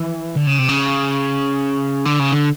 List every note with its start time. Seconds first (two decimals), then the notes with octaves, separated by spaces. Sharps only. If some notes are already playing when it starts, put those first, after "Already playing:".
Already playing: E3
0.37 D3
0.47 C#3
0.59 C3
0.69 C#3
2.06 D3
2.20 C#3
2.32 D3